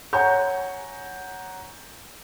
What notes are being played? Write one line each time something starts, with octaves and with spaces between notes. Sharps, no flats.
C#5 F#5 G#5 A#5 C#6 G6